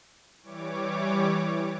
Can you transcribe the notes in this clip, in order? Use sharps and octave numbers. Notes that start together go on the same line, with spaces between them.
E3 G3 C#5 D6